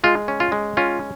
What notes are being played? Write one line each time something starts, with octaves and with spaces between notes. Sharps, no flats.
G#3 F4
C#4
F4
G#3
C#4 F4